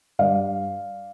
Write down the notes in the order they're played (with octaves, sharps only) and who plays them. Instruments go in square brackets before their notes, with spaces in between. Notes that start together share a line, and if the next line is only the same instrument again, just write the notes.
[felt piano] G2 D5 F5